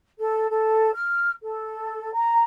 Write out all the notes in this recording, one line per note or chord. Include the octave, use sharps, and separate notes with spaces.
A4
A4
F6
A4
A#5